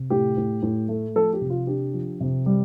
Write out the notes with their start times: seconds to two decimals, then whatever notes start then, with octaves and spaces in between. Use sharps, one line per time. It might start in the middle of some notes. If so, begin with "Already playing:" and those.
Already playing: C3
0.10 A2 G4
0.37 A2
0.63 A2
0.89 A3
1.15 F3 A4
1.33 G4
1.41 C3
1.50 F4
1.67 D4 G4
1.93 F3
2.21 C3
2.46 G3